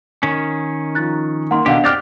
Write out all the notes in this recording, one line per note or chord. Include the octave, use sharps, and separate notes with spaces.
D#3 C#4
F3 D#4 F#6 A6
A#3 D#4 F#5 C6
B2 D3 D#3 D4 G4 F5 F#5
C4 G4 D5 D6 F6 F#6 A6 F7